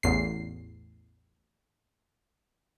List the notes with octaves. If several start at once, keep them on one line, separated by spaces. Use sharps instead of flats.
A1 E2 C7